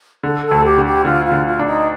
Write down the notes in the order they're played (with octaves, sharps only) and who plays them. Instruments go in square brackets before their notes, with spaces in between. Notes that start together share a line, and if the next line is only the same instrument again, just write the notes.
[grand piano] D3 [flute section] A4
[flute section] A4
[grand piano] D2
[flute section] G4
[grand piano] D3
[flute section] G4
[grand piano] D3 [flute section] F4
[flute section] F4
[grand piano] D3
[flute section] F4
[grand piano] D4
[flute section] D#4